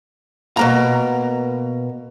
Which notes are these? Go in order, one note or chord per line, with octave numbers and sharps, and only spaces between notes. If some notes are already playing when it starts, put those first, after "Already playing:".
B2 A#3 A#5